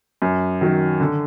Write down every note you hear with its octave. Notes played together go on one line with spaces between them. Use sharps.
F#2
D#3 F#3
D3